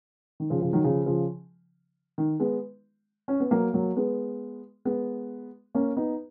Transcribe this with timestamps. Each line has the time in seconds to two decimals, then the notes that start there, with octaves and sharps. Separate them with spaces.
0.40 D#3
0.50 C#3 F3
0.61 C#3 F3
0.73 D#3 F#3
0.84 C#3 F3
1.06 C#3 F3
2.18 D#3
2.40 G#3 B3
3.28 C#4
3.40 B3
3.51 F#3 A#3
3.74 F#3 A#3
3.97 G#3 B3
4.85 G#3 B3
5.75 A#3 C#4
5.97 B3 D#4